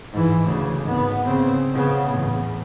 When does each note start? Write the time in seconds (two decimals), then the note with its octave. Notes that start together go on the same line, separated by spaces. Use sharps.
0.12 G#2 E3
0.42 D2 C#3
0.83 G#1 B3
1.25 C#3 C4
1.74 C#3 B3
2.09 E2 A2